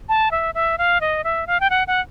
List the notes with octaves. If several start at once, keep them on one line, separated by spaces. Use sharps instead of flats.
A5
E5
E5
F5
D#5
E5
F5
G5
F#5
F#5